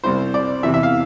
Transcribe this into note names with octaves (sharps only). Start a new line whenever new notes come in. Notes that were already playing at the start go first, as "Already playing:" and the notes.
C2 C3 G3 C4 E4 C5
D5
E2 C3 E3 E5
E5
F5